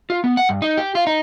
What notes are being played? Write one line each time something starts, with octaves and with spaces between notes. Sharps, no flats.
F4
B3
F#5
G2
D#4
G4
F4
D#4